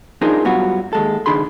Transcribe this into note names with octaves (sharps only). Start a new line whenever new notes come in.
D4 D#4 F4 G#4 A#4 C5
G2 F#3 G3 B3 F4 F#4
D#2 G#3 A4
C#2 D#3 D4 G#4 B5 C6